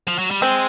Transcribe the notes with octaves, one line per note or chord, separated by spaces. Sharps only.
F3
F#3
G3
G#3 C4